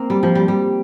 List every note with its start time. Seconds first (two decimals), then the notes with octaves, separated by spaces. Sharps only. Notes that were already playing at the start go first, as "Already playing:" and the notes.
Already playing: A#3 C4
0.10 G3
0.23 F3
0.35 G3
0.48 G3